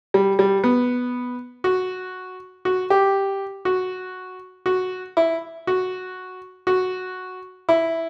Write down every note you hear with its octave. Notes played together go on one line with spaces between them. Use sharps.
G3
G3
B3
F#4
F#4
G4
F#4
F#4
E4
F#4
F#4
E4